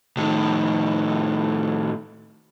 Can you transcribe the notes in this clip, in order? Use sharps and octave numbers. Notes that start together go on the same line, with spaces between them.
A2 D#3